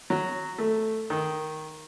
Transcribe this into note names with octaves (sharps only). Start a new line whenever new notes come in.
F#3
A3
D#3